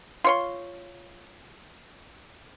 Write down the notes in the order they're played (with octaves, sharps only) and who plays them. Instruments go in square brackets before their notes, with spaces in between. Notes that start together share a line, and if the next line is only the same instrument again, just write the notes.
[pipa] F4 C#5 C6